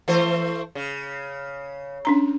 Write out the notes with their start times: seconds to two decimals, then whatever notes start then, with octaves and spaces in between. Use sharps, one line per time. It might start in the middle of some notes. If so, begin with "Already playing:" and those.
0.08 E3 A3 C5
0.75 C#3
2.05 C#4 D4 A#5